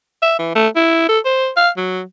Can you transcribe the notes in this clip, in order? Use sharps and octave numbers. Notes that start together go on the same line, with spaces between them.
E5
E3
A3
E4
A4
C5
F5
F#3